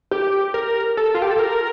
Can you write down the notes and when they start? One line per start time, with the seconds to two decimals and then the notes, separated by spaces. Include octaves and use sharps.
0.11 G4
0.54 A#4
0.97 A4
1.15 F4
1.22 G4
1.31 A4
1.39 A#4